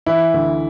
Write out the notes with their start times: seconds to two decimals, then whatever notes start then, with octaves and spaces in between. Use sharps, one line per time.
0.06 E3 E4
0.34 D2